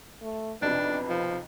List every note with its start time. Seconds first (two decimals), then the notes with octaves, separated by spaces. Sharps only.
0.22 A3
0.62 B1 F2 C3 D4 B4
1.09 F3